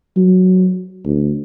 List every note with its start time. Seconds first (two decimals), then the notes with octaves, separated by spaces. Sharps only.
0.17 F#3
1.06 D2